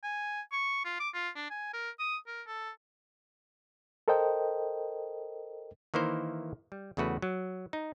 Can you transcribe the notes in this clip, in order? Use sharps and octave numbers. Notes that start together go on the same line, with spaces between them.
G#5
C#6
F4
D6
F4
D4
G#5
A#4
D#6
A#4
A4
A4 A#4 C5 D#5 G5
D#3 E3 A#3 E4 C5
G3
E2 C#3 A3 F#4 B4
F#3
D#4